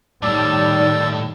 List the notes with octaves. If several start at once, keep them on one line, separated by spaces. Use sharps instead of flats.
A2 D#3 G3 D5 A5 E6 A6